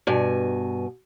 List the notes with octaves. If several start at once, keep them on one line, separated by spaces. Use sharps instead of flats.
G2 B2 G#5